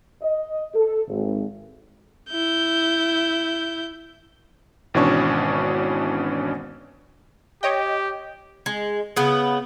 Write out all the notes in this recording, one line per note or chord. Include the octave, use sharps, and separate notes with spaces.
D#5
A4
G#1
E4 G6
G#1 B2 E3 C#4 D4 C#6
G4 C#5 D#5 G5
G#3
C#3 B3